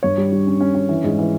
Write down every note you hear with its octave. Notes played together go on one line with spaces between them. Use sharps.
G2 C#5
G3
G3
C#4
C#4
C#4
E3
G#2
E3